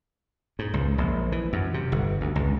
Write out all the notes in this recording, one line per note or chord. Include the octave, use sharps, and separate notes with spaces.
G#2
C#2
A#1
E3
F#2
C3
G1
D2
C#2